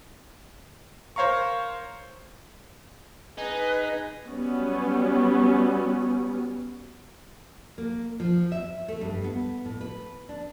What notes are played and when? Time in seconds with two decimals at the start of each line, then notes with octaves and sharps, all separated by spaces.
1.16 A#4 C5 C#5 F5 A#5 C#6
3.38 D#4 G#4 B4
4.28 F#3 G3 B3 C#4
7.78 A#3
8.20 F3
8.52 E5
8.88 A3
9.01 G2
9.24 B3
9.65 A2
9.81 B4
10.29 D4